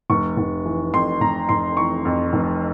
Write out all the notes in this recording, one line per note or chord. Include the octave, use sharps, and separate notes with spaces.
F1 C#6
F1
E3
F2 C6
F1 A#5
F1 C6
E3 C#6
F2
F1